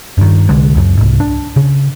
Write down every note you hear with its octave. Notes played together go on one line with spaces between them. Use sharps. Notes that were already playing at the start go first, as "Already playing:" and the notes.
G2 D#3
C2 D3 G#3
C#2 F#2
C2 G#2
D4
C#3